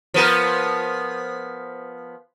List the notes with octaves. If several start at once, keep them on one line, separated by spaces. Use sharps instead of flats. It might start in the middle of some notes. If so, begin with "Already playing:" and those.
F3 B3 A#4